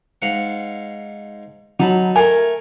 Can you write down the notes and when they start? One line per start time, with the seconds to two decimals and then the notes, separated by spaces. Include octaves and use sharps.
0.22 G#2 F5 F#5
1.79 F#3 D#4 A5 B5
2.16 A3 A#4 G#5